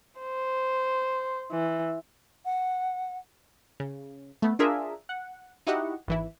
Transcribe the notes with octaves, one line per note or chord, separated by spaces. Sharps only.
C5
E3
F#5
C#3
A3 B3
D4 F4 G#4 A#4 E5
F#5
D#4 E4 F#4 G4 D#5 F#5
G#1 E3 E4